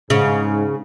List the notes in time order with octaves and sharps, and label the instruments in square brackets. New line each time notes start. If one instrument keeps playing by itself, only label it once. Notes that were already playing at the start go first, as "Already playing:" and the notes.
[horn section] G#2 [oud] C#3